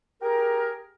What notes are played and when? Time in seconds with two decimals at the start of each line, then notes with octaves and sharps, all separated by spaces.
0.22 G4 G#4 A#4